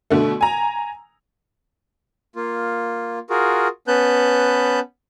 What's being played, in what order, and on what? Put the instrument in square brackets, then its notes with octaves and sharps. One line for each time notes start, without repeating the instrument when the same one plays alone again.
[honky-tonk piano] B2 D3 A3
G#5 A#5
[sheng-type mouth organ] A#3 F4
F4 F#4 G#4 A#4
B3 C#4 B4 A5 F#6 G6